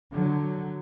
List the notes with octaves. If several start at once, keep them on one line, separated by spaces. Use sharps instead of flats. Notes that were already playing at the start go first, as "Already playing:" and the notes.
D3 F#3